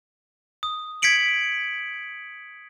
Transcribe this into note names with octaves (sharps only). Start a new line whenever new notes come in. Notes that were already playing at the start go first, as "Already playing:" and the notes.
D#6
G#6 B6 C#7 D7 F#7